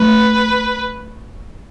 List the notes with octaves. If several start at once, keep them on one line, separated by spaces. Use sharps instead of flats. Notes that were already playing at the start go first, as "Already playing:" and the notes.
Already playing: A3 B4